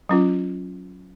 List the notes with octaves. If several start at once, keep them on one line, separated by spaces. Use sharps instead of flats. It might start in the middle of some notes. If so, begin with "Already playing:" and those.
F#3 C#4 F4